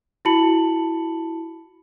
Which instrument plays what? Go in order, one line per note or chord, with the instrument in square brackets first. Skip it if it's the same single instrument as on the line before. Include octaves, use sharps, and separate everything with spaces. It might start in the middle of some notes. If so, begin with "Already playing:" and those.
[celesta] E4 F#4 A5 B5 C#7 F#7